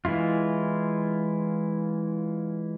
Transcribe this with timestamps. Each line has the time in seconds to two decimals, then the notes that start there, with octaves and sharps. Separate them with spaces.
0.05 E3 G#3 E4 F4